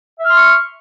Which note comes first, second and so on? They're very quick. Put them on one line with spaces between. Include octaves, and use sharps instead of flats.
E5 F6 C6 C#6